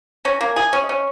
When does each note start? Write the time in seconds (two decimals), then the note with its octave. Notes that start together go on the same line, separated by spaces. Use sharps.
0.25 C#4 A#5
0.41 A#3 G#5
0.56 G#4
0.73 C#4
0.84 D#5
0.89 C#4 C#5